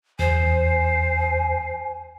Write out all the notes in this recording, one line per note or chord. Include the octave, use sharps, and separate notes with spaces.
E2 C5 G#5 C7